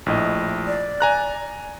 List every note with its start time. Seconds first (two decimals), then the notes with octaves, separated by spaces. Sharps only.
0.06 A#1 A2 D#5
0.67 D5
1.00 G#5 A#5 F#6